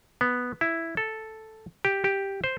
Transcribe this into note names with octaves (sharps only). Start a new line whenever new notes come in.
B3
E4
A4
G4
G4
C5